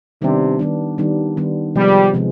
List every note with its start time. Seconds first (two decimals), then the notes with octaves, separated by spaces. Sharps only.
0.22 C3 D#3 G3 B3 D4
0.59 D#3 G3 B3 D4
0.98 D#3 G3 B3 D4
1.37 D#3 G3 B3 D4
1.75 C3 F3 G3 G#3 B3
2.14 C3 F3 G#3